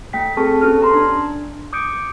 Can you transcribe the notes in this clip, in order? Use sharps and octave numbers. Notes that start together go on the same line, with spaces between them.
A3 G5 B6
C4 G#4 A4 A5 C#6
B3 C#4 G4 A4 F6
A5 A#5 C6
D4
D6 D#6 G6 C#7 D7